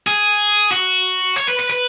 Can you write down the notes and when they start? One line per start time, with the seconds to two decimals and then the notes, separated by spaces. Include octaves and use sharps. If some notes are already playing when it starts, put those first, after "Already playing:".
0.07 G#4
0.71 F#4
1.37 C#5
1.48 B4
1.59 B4
1.70 B4